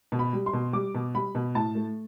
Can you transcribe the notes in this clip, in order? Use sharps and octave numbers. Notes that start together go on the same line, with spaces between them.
B2
B5
G3
C6
B2
G3 D6
B2
G3 B5
B2
A2 A5
A3